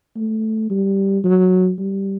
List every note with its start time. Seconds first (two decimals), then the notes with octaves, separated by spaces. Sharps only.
0.16 A3
0.70 G3
1.25 F#3
1.80 G3